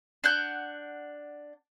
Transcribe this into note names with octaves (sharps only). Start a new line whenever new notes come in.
D4 F#5 G6